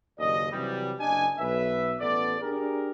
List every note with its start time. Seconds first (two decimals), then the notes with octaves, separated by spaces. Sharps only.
0.18 F#1 D#2 D5 D#5
0.52 C3 E3 F#3 G3
1.00 F#1 D4 D#5 G#5
1.39 B1 B4 E5
2.00 A1 B3 A4 D5
2.42 D4 G4 G#4 A#4